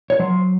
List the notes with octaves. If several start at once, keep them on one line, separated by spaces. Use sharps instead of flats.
C#5
F#3 C5